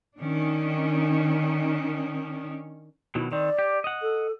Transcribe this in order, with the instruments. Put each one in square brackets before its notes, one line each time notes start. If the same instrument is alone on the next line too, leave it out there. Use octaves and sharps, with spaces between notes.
[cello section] D#3 C#4 D4
[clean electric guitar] B2 D#3 F#3 [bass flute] E4
[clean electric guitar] D#3 C4 [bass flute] D5
[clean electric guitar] G4
D#5 F#5
[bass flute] A4